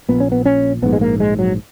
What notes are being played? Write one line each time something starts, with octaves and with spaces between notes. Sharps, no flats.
A#1 A#2 B3
C#4
B3
C#4
A#1 G#2 B3
G#3
A#3
G#3
F#3